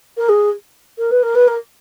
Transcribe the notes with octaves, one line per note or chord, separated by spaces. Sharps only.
A#4
G#4
A#4
B4
A#4
B4
A#4